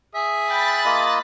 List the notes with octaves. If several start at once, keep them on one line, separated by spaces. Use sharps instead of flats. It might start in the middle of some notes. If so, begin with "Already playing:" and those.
G#4 E5 D#6
G5 B5 F#6 A6
A#3 F4 D#5